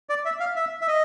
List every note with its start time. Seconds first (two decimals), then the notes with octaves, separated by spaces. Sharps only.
0.09 D5
0.25 E5
0.40 F5
0.56 E5
0.81 E5
0.88 D#5